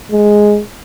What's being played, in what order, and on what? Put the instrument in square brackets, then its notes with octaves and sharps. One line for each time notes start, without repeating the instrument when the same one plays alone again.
[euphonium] G#3